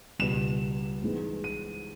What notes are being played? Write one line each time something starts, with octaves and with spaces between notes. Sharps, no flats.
C#2 B2 G3 E7
G#2 E3 G#3 B3
D#7